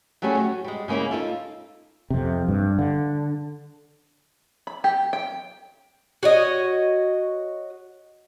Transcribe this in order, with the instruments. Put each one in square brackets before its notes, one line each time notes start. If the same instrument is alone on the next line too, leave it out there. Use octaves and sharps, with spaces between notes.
[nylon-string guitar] F#3 G3 A3 C#4 G#4
F#4
G3 G#3
C#3 G#3 A#3 C#4 E4
D#4 F4 A4
[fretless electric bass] F2 C3
G2
D3
[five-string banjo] B5
G4
G5
[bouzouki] F#4 C#5 D#5